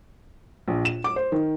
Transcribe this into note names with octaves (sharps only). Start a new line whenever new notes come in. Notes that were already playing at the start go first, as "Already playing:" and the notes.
A#1
E7
D6
C5
D#3